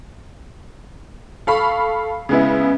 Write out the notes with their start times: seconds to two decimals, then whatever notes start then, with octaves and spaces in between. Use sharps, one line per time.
1.47 A4 F5 B5 C#6
2.29 C#3 G#3 B3 E4